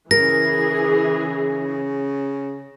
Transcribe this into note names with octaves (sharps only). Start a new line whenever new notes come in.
C#3 E3 G#4 A#4 A#6